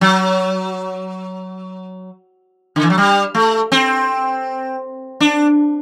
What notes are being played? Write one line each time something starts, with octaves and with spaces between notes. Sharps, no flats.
F#3
D3
E3
F#3
G3
A3
C4
D4